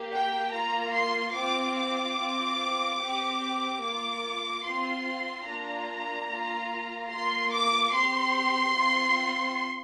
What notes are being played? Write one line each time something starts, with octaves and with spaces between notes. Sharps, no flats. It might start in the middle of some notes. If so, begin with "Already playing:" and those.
Already playing: A#3 G4
G5
A#3 F4 A#5
C6
C4 F4 D6
D6
C4 F4
C4 G4
A#3 F4 D6
C4 F4 C6
A#3 D4 F4 A#5
A#3 F4
A#3 F4 C6
D6
C4 G4 C6
C4 F4